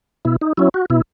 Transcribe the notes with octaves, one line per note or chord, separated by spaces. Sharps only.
B2 E4
D#4
F#3 C#4 E4
F#4
B2 E4